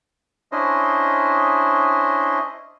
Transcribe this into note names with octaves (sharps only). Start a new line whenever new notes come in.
C#4 D4 E4 C5 D#5